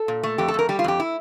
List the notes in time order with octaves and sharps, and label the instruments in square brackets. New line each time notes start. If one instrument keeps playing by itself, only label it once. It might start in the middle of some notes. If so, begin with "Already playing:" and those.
Already playing: [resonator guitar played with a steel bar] A4
A#2
A3
F2 G4
A4
F2 A#4
G3 G4
F4
F2 G4
E4